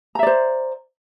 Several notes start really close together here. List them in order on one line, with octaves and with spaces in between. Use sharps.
A#5 E5 D5 C5